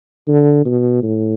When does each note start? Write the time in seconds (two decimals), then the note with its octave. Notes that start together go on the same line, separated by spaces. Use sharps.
0.28 D3
0.65 B2
1.03 A2